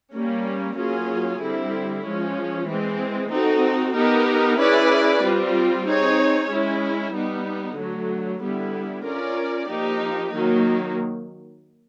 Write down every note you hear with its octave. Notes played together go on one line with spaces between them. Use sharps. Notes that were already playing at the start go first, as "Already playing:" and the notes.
G3 A#3 C#4
F#3 A#3 C#4 F4 G#4
D3 G3 C4 E4
F3 G#3 C#4
E3 G#3 C4
C4 D#4 F#4 A4
B3 D#4 G4 A#4
C#4 E4 G#4 B4 D5
G3 C4 F4
C4 D#4 G#4 C#5
G#3 C#4 E4
G3 B3 D#4
D3 F#3 A3
D3 G3 B3 E4
C#4 F4 A#4 D5
F3 A#3 D#4 G4
D#3 F#3 A#3 D#4